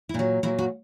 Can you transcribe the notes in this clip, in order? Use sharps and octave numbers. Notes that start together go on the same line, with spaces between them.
E4
A#2 F#3 D4
A#2 F#3 E4
F#4